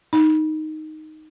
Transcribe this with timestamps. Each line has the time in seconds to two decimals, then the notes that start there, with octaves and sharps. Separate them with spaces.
0.13 D#4